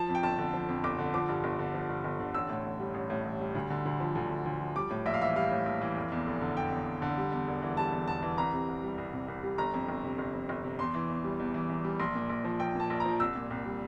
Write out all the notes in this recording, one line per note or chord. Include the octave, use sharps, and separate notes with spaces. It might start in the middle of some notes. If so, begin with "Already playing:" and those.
Already playing: F3 A5
F2
G5
G1 A5
D3
F3
F2
G1 D6
D3
F3 D6
G2
G1
D3
F3
G2
G1
D3
A1 E6
A2
A1
G3
A1
A2
A1
G3
D2
D3
D2
F3
D2
D3
D2
F3
G3 D6
A2
A#1 E5
F5
E3 E5
G3 F5
A2
A#1
E3
F1
E2
F1
D3
F1 G5
E2
F1
D3
G3
E2
E1
E3
G3 A5
E2
E1 A5
E3
C2 A#5
C3
C2
G3
C2
C3
C2
G3
G1 A#5
F2
G1
C3
G1
F2
G1
C3
E2 C6
E3
E2
G3
E2
E3
E2
G3
A#1 C6
A#2
A#1
F3
A#1 G5
A#2 A5
A#1
A#5
F3
C2 E6
A#2
C2
G3